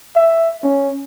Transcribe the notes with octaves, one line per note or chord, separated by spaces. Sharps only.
E5
C#4